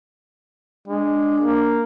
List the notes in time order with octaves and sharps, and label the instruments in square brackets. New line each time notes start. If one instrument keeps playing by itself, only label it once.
[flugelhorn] G#3 [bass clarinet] D4
[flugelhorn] A#3